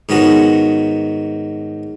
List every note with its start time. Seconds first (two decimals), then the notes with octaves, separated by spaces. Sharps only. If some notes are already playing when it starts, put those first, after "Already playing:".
0.09 G#2 D#3 B3 C#4 F#4